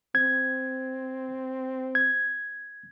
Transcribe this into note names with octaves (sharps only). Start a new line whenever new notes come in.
C4 G#6
G#6